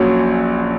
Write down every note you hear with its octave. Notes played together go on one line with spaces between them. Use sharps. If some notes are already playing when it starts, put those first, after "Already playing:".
Already playing: A#1 A#2 F#3 C#4 F#4